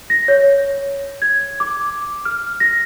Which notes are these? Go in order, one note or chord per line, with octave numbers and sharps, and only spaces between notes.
A#6
C#5
G#6
D6
F6
A#6